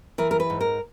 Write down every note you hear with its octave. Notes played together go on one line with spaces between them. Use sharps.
E3 A#4
A#4
B4
G#2
A#4